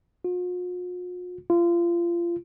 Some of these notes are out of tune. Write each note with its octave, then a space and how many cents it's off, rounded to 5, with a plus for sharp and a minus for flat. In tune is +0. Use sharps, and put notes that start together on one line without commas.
F4 +45
F4 -30